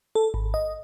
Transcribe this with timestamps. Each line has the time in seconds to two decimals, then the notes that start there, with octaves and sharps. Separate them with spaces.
0.15 A4
0.34 G#1
0.54 D#5